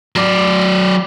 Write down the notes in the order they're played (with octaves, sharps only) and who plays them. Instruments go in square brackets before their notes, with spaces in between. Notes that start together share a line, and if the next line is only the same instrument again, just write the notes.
[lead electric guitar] F#3 D5